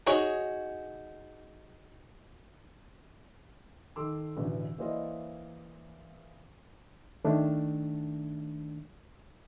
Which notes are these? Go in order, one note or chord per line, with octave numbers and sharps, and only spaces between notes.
D#4 F#4 G#4 C#5
D#3 A4 C6 D6 E6
A1 B2 D3 E3
E3 A#3 E4 C5 D5 D#5
D#3 A3 D4